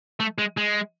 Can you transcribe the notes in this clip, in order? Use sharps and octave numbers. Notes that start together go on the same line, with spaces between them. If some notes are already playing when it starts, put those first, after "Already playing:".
A3
G#3
G#3